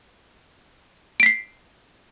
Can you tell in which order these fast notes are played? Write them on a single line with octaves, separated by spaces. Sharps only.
D7 B6 C7